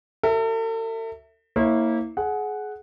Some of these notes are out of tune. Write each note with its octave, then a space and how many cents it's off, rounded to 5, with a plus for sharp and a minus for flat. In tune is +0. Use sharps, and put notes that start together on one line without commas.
F#4 +45 A4 +45 E5 +0
A#3 -10 E4 -30 C#5 -35
G#4 +25 F#5 +0